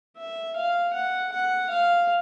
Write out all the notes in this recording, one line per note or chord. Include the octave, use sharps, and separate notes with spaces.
E5
F5
F#5
F#5
F5